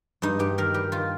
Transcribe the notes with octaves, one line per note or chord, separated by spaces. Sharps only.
G2 D#4
G2 G4
D#3 A#4
G3 G4
D#3 F4